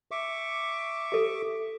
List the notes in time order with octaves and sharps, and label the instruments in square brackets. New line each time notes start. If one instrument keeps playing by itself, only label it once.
[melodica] E5 C#6 D6
[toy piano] G4 A4